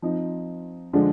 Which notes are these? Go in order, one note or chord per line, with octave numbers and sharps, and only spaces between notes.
F3 C4 D#4
D3 F3 G#3 D4